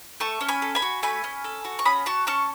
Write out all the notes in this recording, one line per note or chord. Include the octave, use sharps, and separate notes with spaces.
A3 A5 C#6
C#4
G#5 B5
A4
G#5 B5
F#4
A3 G#5 B5
C#4
A4
F#4
C#6
C#4 B5 D#6
F#4 A5 C#6
C#4 A5 C#6